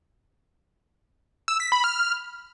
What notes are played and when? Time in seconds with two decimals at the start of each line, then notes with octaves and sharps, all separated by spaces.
1.48 E6
1.60 B6
1.72 B5
1.84 F6